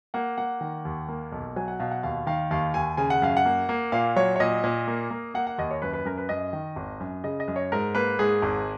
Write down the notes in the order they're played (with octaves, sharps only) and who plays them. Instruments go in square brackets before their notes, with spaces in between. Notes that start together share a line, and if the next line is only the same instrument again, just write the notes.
[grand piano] A#3 F#5
A#3 F#5
D#3
D#2
A#3
B1
F#3 G#5
F#5
B2 F5
F#5
D#2 F5
D#3 F5
D#2 F5
D#2 G#5
C#3 G#5
F#5
F#2 F5
F#5
A#3
A#3
A#2 F5
F#3 C#5
C#5
A#2 D#5
A#2
A#3
A#3
A#3 F#5
F#5
D#2 D#5
C#5
F#2 B4
B4
F#2 A#4
B4
F#2 D#5
D#3
G#1
F#2
C#3 D#5
D#5
F#2
C#5
G#2 A#4
A#3 B4
G#2 G#4
G#1